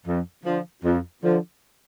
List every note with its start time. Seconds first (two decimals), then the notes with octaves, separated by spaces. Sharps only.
0.06 F2
0.45 D3 F3
0.84 F2
1.23 D3 F3